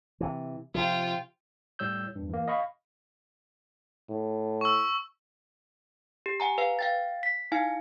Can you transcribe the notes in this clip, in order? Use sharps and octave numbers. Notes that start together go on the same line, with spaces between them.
C3 E3
C3 F3 F4 G5
A2 G3 C#5 E6 G6
E2 G2
E3 A#3
D#5 F5 B5 C#6
A2
C#6 E6
G4
F#5 G#5 A#5
B4 F5
F5 G5 A6
B6
D#4 E4 F5 G#5